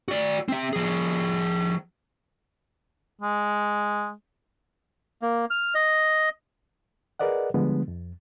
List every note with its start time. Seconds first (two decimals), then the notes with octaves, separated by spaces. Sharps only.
0.08 F#4 D5
0.49 C4 E5
0.73 F3 G#4
3.21 G#3
5.22 A#3
5.50 F6
5.75 D#5
7.19 G#4 A#4 B4 D5 D#5 F#5
7.54 D3 F3 G3 G#3 B3 D4
7.88 F2